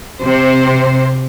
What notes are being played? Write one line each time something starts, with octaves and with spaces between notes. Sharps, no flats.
C3 C5